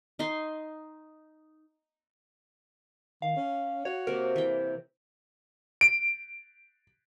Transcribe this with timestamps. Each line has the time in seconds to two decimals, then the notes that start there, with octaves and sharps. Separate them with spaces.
0.19 D#4 C6
3.22 D#3 F5
3.37 C#4
3.85 F#4 C#5
4.07 C3 A#3 A#4
4.36 E3 G5
5.81 D7